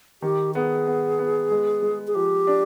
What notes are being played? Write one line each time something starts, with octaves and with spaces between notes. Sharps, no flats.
D#3 G4
B3 G#4
B3
B3
G#3
G#3
G#4
F3 G4
D4